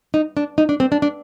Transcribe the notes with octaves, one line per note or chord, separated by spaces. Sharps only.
D#4
D4
D#4
D4
C4
D4
D4